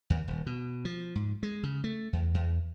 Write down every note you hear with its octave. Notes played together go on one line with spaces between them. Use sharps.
D#2
D#1
B2
F3
G#2
G#3
C#3
A3
E2
E2